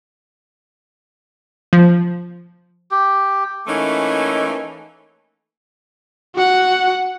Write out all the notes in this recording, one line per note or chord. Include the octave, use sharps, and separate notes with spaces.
F3
G4
E3 A3 A#3 C#4 D#4
F#4 F#5